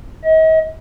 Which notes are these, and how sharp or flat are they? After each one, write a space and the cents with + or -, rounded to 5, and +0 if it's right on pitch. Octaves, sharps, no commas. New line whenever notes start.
D#5 +40